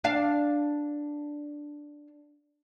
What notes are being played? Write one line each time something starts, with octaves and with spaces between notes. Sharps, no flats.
D4 F5